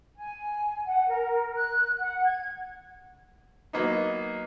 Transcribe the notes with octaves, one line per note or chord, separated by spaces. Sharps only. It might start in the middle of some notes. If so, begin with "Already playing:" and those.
G#5
F#5
A#4
F#6
F#5
G#6
F#3 A#3 B3 D#4